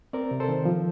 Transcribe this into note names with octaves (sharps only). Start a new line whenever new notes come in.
C4 A#4 D5
C3
A4 C5
D#3
F3